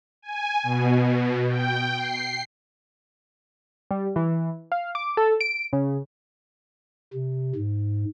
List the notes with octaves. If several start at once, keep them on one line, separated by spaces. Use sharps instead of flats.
G#5
B2
G5
C7
G3
E3
F5
D6
A4
D7
C#3
C3
G#2